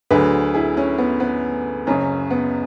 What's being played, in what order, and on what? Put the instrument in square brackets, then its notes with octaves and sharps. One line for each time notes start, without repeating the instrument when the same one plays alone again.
[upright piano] D2 D3 F#3 G#4 B4
E4 G#4
C#4
B3
B3
F#1 F#2 C#3 C#4
B3